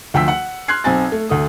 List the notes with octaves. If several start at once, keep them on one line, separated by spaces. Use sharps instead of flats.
D2 F3 G5 E6 B6
F#5
C6 F6 F#6 G#6 C7
B1 C4 G#5 A6
A3
D2 A3 D#6